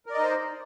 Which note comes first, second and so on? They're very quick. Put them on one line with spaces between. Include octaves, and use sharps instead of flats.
A#4 D5 D#5 D#4 C5